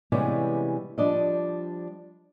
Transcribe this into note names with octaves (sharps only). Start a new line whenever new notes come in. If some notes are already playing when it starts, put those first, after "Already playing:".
C3 E3 G3 G#3 B3 C#4
F3 G3 D4 D#5